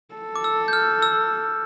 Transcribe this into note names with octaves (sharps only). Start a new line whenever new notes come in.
A4
D6
E6
G6
F6
E6